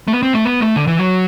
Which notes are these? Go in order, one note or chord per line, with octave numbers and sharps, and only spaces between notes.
A3
B3
C4
A3
B3
A3
D3
E3
F#3